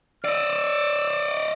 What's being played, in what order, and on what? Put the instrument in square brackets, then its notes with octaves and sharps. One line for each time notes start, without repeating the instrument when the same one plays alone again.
[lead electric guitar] D5 D#5 [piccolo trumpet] E6